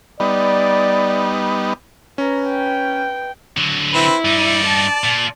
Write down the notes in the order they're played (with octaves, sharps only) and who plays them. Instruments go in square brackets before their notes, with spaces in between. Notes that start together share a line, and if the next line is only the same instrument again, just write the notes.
[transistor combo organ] G3 B3 D#4 [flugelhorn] D5
[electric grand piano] C#4 [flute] B4 [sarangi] A#5
[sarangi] G5
[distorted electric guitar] D3 F#3
[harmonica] C4 B4 [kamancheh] E4
[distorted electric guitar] G2 D#4 [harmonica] D5
[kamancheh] A5
[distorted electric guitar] A#2